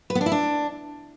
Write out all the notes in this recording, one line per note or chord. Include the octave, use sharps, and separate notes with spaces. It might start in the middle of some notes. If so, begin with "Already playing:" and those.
B4
B3
D4
E4
D4